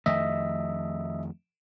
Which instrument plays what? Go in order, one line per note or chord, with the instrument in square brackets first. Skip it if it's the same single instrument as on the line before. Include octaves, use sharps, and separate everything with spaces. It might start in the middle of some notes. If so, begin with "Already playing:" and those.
[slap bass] F2 D#3 A3 [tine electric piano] D#5 E5